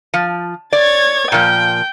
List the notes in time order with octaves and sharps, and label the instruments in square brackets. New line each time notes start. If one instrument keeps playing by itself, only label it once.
[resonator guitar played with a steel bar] F3
[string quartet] C#5 G#6 A6 [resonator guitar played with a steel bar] D5
[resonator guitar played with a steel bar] A#2 F3 [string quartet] G5